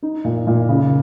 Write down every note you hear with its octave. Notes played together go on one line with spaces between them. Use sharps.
D#4
A#2
A#2
C#3